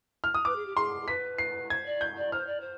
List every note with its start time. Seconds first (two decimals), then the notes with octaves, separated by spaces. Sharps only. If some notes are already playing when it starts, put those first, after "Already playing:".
0.24 F6
0.34 D#6
0.45 B4 D6
0.56 G#4
0.66 G4
0.76 G#4 C6
1.01 G#4
1.08 B4 B6
1.38 C7
1.70 C5 G#6
1.86 D5
2.01 G6
2.17 D5
2.32 C5 F6
2.47 D5
2.61 C5